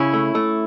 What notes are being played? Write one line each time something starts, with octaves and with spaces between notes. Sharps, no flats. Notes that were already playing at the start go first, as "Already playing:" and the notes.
Already playing: C#3 C#4 E4
A3
A3